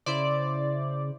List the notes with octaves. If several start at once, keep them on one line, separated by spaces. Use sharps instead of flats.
C#3 E4 C5 D5